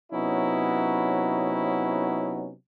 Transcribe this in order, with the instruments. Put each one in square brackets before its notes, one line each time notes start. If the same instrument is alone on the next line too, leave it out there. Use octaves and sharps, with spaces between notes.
[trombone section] C3 F#3 B3 C#4 D#4 E4